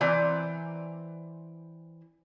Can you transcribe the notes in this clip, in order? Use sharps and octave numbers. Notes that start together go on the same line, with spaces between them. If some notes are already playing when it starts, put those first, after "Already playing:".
E3 C4 C5 D5 G#5 A#5